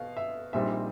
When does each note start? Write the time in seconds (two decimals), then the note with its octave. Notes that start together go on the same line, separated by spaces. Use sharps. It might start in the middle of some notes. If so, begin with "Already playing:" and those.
Already playing: B2 F5
0.17 E5
0.53 A#1 A#2 G3 C4 D#4 E5